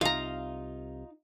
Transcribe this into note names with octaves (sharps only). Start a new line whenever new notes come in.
C2 C3 D#4 F4 F5 A#5